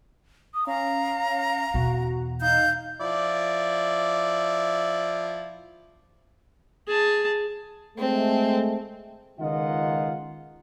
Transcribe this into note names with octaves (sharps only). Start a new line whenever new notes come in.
D#6
C#4 F5 A#5
E2 B2 F#4
D#4 F5 G6
F3 E4 D5
G#4 A5
G#3 A3 C4
C#2 D#3 D#4 F4 D#5 F#5